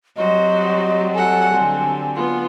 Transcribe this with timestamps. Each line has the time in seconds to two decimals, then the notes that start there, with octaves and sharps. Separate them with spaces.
0.17 F#3 G3 C4 F#4 C5 D#5
1.14 A4 F#5 G#5
1.53 D3 F#3 G3 C4
2.15 B3 F4